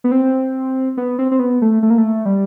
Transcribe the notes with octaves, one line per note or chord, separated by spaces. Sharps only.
B3
C4
B3
C4
C4
B3
A3
A3
A#3
A3
G3